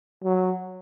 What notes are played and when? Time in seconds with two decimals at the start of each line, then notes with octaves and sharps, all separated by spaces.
0.24 F#3